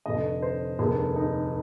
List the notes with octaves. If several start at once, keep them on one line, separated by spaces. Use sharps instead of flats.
F1 F2 D3 D#5
C5
F1 D#2 D3 G#4
D#4